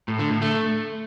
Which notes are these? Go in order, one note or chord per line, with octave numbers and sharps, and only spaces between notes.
A2
D3
A2
A3